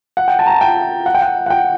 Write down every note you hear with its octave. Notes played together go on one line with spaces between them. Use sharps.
F#5
G5
A5
A#5
A5
G5
F#5
G5
F#5
F#5
G5